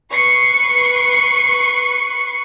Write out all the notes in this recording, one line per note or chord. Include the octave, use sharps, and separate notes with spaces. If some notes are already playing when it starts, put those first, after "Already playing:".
B4 C#6 C7 C#7